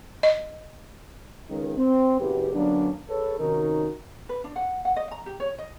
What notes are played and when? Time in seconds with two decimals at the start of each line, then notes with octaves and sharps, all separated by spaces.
0.23 D#5
1.50 C#2 D#3
1.78 C4
2.20 F#1 E2 G4 B4
2.54 D3 F#3 A#3 B3 C#4 D4
3.09 G#4 A4 B4 C#5
3.40 C3 D#3 C#4 D#4 F#4 A#4
4.29 B4
4.44 D4
4.56 F#5
4.85 F#5
4.96 D#5
5.11 A#5
5.26 G4
5.40 C#5
5.58 D#5